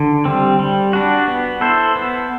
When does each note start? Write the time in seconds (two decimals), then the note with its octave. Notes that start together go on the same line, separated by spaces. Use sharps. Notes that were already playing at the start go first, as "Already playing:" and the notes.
Already playing: D3
0.25 G3 C4
0.59 G3
0.93 D4 F#4
1.28 B3
1.61 E4 A4 C5
1.96 B3